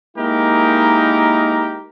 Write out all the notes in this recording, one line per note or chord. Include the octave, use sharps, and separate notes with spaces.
G#3 A#3 D#4 E4 G4 A#4